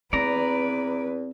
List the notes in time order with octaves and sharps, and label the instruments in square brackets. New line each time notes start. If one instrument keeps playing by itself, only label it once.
[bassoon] E2 [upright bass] C4 [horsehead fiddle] B4 [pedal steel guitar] D5 A#5